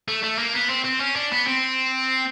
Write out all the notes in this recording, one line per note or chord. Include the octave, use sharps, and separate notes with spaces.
A3
A3
A#3
B3
C4
C4
C#4
D4
B3
C4